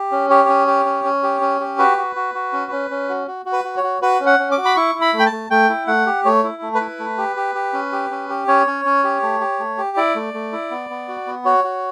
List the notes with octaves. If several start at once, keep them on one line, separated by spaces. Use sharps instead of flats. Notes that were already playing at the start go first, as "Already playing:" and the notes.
Already playing: G4
C#4
G4 C#5
C#4
G4
C#4
C#4
G4
C#4
G4
F#4 B4
F#4
F#4
F#4
C#4
C#4
C#4
F#4
F#4
F#4
B4
F#4
C#5
F#4
F#4 B4
C#4
F#5
C#4
D6
F#4
B5
E4 C#6
E4
B5
A3
G5
A5
A3
A3 G5
E4
A3 F#5
G4
A3 C#5
E4
A3
B4
E4
A3
G4
G4
G4
C#4
G4
C#4
G4
C#4 C#5
C#4
C#4
G4
A3
G4
A3
G4
E4 D5
A3
A3
E4
B3
B3
F#4
B3
F#4 C#5
F#4